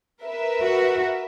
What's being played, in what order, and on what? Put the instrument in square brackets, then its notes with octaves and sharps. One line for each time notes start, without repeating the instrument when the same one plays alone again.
[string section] A#4 B4 E5
[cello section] F#4